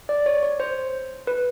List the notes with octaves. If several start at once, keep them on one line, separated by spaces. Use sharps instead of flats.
D5
C#5
C#5
C5
B4